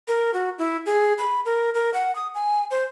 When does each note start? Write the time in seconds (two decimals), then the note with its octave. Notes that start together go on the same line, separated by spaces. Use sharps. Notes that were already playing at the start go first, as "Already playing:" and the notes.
0.08 A#4
0.34 F#4
0.59 E4
0.86 G#4
1.18 B5
1.45 A#4
1.74 A#4
1.94 F#5
2.16 D#6
2.34 G#5
2.71 C5